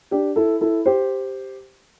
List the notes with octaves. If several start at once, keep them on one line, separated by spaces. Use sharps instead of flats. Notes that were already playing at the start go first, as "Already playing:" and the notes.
D4 G4
E4 A4
E4 A4
G4 C5